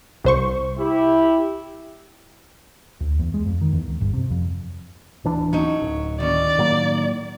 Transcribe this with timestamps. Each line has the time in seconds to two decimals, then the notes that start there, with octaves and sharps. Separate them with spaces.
0.24 C2 C5 C#6
0.78 E4 G4
3.01 D2
3.19 E2
3.34 G#3
3.46 F2
3.61 D#3
3.73 E2
3.88 C#2
4.01 G1
4.14 C3
4.31 F2
5.24 D1 E3 D4
5.53 F#3 C#4 D#4
5.82 D1
6.20 D#3 C#4 D5
6.58 A2 F#3 A#3